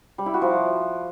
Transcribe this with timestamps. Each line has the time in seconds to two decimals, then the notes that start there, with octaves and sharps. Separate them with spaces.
0.18 G3
0.26 E4
0.34 F#4
0.42 F3